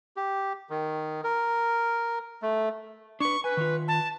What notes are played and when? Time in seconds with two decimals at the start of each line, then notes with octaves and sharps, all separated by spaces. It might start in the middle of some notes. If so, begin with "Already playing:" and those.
0.17 G4
0.70 D#3
1.24 A#4
2.42 A3
3.20 D4 B4 C#6
3.44 B4 G#5
3.57 D#3 F4
3.88 A5